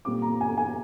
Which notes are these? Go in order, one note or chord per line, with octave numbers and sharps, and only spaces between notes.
A#2 G3 C4 D6
A#5
G#5
G#5